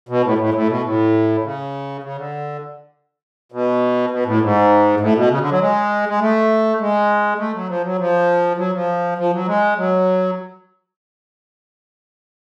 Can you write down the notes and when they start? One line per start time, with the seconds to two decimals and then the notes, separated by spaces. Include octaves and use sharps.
0.09 B2
0.24 A2
0.38 A2
0.49 G#2
0.54 A2
0.69 B2
0.83 A2
1.44 C#3
2.03 C#3
2.17 D3
3.52 B2
4.11 B2
4.26 A2
4.42 G#2
5.00 A2
5.16 B2
5.30 C#3
5.41 D3
5.51 F#3
5.61 G#3
6.09 G#3
6.20 A3
6.80 G#3
7.39 A3
7.54 F#3
7.69 F3
7.83 F#3
7.99 F3
8.58 F#3
8.74 F3
9.18 F3
9.33 F#3
9.47 G#3
9.77 F#3